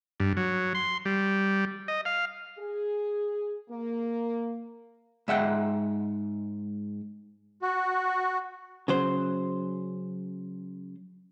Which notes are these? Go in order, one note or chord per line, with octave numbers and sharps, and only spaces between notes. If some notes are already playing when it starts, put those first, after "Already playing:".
G2
F#3
C6
G3
D#5
F5
G#4
A#3
G#2 E5 F#5 G5
F#4
C#3 F#3 C5